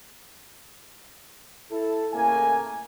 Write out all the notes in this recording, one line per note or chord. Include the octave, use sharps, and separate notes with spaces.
E4 A4
A2 C#3 A3 A#3 G#5